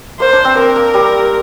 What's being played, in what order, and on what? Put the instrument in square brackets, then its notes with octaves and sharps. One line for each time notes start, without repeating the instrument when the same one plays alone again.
[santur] A#3 [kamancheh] C5
[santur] D4
C4
[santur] C4 [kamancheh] A#4
[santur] A#3
G3